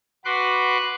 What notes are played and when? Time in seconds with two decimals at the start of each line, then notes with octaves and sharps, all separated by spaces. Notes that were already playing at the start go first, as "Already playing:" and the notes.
0.25 F#4 B4 C6 D6 F#6